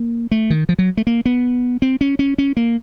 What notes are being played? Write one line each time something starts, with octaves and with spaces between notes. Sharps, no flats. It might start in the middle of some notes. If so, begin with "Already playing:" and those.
Already playing: A#3
A3
D#3
F3
F#3
A3
A#3
B3
C4
C#4
C#4
C#4
A#3